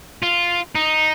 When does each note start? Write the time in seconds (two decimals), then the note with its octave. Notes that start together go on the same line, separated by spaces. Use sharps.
0.23 F4
0.75 D#4